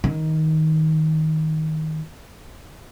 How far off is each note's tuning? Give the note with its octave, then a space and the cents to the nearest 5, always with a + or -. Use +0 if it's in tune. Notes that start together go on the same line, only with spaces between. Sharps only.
D#3 +15